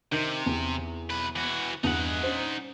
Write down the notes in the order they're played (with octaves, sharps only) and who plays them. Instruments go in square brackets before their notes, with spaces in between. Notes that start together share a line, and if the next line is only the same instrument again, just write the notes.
[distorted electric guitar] C3 [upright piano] D#3 G6
[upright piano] E2
[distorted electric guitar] B1 B4
E3 F#4
[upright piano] E2 G2 [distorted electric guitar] D#4 F#5
[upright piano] C#4 D4 C5